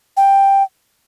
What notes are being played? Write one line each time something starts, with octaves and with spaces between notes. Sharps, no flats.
G5